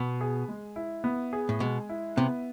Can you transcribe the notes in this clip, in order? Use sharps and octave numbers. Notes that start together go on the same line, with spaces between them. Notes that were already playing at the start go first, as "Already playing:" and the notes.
Already playing: B2 B3
G#4
G#3
E4
B3
G#4
A2
B2 G#3
E4
C3 B3